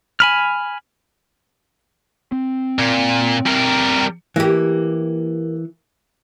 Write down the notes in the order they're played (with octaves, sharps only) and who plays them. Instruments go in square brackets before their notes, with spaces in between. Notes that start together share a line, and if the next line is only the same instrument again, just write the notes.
[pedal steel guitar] G#5 B5 F6
[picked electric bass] C4
[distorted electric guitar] A#2
G3 A#4
[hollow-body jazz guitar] E3 [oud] A#3 G4